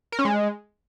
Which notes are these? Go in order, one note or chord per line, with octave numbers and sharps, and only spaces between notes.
A#4
C#4
G#3